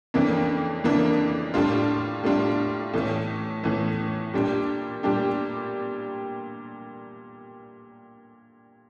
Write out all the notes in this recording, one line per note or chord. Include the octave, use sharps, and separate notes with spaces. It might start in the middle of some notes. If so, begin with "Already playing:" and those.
F2 C#3 E3 A#3 D4
F2 C#3 E3 A#3 D4
A2 G3 D4 F4
A2 G3 D4 F4
A2 E3 A3 C#4
A2 E3 A3 C#4
A#2 G3 D4 G4
A#2 G3 D4 G4